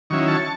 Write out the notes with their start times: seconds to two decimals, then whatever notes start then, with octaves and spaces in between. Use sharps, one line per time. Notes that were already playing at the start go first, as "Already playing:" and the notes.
0.10 D#3 F#3 C#4 E4 C#6
0.28 A5 C#6